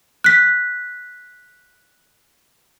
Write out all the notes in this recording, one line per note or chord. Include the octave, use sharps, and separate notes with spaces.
F#6 B6